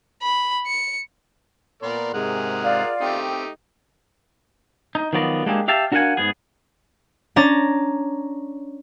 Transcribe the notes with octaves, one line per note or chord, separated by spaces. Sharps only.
B5
C#7
A#2 B3 A#4 D5 C6
G#2 C3 G#3 G#4 A#4 F#5
F4 D5
A3 C4 D#4 G4
D#4
D#3 F3 F#3 B3 D5 D#5
G#3 A#3 D4 E4 G4 G#4
G4 E5 F5 G5 A5
D4 F#4 A#4 F5 F#5 G#5
G#2 B3 G#4
C#4 D4 A#5 A6